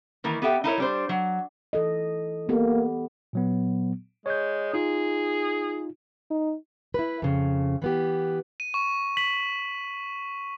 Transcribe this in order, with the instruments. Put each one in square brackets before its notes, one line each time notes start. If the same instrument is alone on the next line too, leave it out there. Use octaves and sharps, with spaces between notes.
[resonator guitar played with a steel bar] D#3 E3 A#3
B3 G4 A4 E5 G5
D#4 E4 A#4 C#5
G3 D4 C5
F#3
[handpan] E3 A4 D#5
[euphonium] A#3 [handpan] B3 G4 A4
[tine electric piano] A#2 F#3 B3
[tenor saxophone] G#3 [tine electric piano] C#5 G6
[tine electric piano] D#4 F4 [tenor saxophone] G#4
[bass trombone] D#4
[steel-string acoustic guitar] E4 B4
F2 C#3
E3 B3 G4
[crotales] D#7
C#6
[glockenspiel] B6 F#7